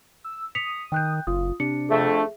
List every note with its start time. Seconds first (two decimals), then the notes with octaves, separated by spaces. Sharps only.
0.24 E6
0.55 D#6 B6 C#7 F7
0.92 D#3 G5 F#6 G6
1.27 F#1 F4 D#6
1.60 C3 D4 C#7
1.89 F2 A3 G#4 E5